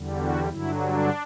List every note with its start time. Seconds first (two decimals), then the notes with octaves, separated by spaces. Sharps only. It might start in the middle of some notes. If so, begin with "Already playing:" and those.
Already playing: E2 D3 G3
0.19 F#4
0.49 G2 D3 F#3 E4
0.80 D4